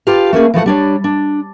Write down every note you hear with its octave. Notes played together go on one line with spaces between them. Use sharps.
F4 G4 A4 B4 F5
A3 A#3 C#4 G#4
E3 F3 A3 F#5
G3 D4 C#5
D4